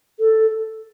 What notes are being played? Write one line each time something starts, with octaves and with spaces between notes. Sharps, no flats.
A4